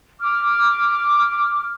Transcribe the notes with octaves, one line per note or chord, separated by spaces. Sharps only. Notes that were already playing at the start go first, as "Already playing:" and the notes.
D6 F6